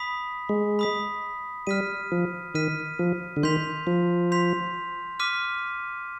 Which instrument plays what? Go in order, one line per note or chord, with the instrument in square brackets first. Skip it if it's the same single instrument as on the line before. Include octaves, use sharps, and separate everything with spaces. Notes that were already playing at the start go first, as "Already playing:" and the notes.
Already playing: [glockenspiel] B5 D#6 B6
[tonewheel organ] G#3
[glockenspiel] B5 D#6 B6
[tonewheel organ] G3 [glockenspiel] F6 B6 D#7
[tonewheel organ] F3
[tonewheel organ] D#3 [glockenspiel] F6 B6 D#7
[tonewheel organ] F3
D3
[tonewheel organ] D#3 [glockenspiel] C6 G6 B6 F7
[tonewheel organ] F3
[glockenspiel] C6 G6 B6 F7
D6 F6 B6 D#7